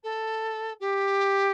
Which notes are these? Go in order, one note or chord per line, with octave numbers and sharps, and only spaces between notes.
A4
G4